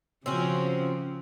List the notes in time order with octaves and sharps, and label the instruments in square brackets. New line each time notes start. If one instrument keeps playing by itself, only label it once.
[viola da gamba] C#3 F3 [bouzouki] C4 C#4 F#4